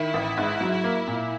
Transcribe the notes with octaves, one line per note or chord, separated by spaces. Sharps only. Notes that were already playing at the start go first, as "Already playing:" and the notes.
Already playing: D#3 E4
A1
G#2
F#3
A#3
A#2